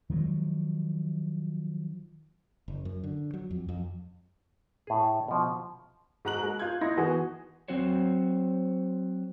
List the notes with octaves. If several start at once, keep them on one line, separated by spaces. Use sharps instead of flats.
D#3 F3 F#3 G#3
F#1
F#2
D3
F#3
F2
F2
A2 G#4
B2 F3
G#2 F#4 A#5 F#6 F#7
G#3
F4 G6 G#6
D#4 E4 C6 A#6
E3 B3 F#4 G#4
F#3 C4 F#4 C5 C#5